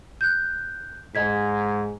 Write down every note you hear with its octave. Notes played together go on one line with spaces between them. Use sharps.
F#6 G6
G#2 D#5 G#6 B6